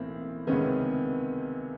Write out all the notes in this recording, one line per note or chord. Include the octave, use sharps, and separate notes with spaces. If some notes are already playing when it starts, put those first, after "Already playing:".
Already playing: B1 A2 E3 A#3 C4
C#2 C3 D#3 B3 C#4